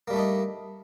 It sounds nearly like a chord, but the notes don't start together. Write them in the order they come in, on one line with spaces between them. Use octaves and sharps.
A#3 G3 A3 D4 D#4